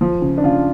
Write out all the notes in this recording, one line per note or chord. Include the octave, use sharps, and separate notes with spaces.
F3
C#3
D4
C#3 F4